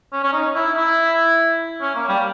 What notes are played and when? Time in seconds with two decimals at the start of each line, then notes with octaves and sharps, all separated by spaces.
0.13 C#4
0.23 C#4
0.33 D#4
0.55 E4
0.75 E4
1.81 C#4
1.95 A#3
2.08 G3